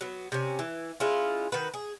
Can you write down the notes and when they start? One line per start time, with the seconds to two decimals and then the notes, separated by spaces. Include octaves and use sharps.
0.01 F#3 B3
0.32 C3 C#4
0.59 E3
1.00 G#3 C#4 E4 F4
1.52 D#3 F#4 B4
1.74 G#4